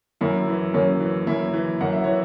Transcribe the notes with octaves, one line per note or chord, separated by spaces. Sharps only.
F#2 E4
E3
F#2 C#4
E3
F#2 E4
E3
F#2 F#5
E5
E3 C#5